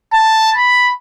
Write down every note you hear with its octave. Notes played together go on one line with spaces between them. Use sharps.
A5
B5